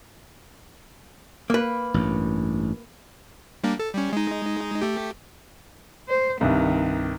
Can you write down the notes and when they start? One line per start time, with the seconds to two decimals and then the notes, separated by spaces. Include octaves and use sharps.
1.50 A#3 B4
1.94 A1 G2
3.64 G3 A#3 D4
3.80 A4
3.95 G3 C#4
4.13 G#3 D#4
4.82 A3 G4
6.08 C5
6.41 C2 G2 D#3